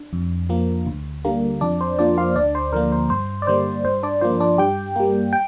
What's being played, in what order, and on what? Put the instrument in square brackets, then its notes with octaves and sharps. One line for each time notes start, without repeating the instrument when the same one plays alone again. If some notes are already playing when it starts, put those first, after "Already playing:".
Already playing: [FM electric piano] D4
F2
F3 A#3
D2
D3 G3 A#3
F2 D4 D5
C5
F3 A#3 D4 D5
F4 F5
D2 D4 D5
C5
D3 F3 A#3 A#4
C5
G2 C5
D5
D3 G3 A#3 C5
G2 C5
D4 D5
F3 A#3 C5
D4 D5
G2 G4 G5
G3 A#3
G5